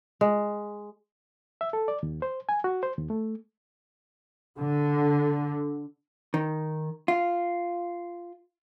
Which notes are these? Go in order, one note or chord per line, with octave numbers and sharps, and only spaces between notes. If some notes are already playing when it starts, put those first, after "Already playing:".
G#3
E5
A4
D5
D#2
C5
G#5
F#4
C5
D#2
A3
D3
D#3
F4